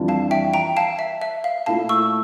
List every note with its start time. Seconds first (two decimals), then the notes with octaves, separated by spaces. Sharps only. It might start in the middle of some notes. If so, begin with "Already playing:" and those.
Already playing: F2 E3 G3 D4 F4
0.08 F5 A5
0.31 E5 G5
0.54 G5 A#5
0.77 F5 A5
0.99 E5
1.22 E5
1.44 F5
1.66 A#2 A3 E4 F5 A5
1.89 C#6 E6